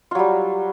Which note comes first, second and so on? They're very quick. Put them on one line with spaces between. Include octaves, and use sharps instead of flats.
F4 F#3 G3